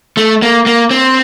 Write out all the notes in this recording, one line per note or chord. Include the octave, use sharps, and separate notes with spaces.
A3
A#3
A#3
C4